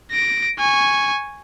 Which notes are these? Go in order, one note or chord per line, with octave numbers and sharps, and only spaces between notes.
A#6 D7
G#5 C#6